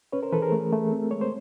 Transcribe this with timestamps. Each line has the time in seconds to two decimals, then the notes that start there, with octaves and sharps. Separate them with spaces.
0.12 C#4 B4 C#5
0.23 A#4 C5
0.32 E3 A4 B4
0.42 G#4 A#4
0.52 A3
0.72 A3
0.92 C4
1.11 G#3 C#5
1.21 C5